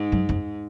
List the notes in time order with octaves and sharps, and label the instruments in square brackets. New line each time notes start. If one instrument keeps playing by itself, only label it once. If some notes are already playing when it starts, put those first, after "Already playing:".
Already playing: [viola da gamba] G#2
[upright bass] F#2
F2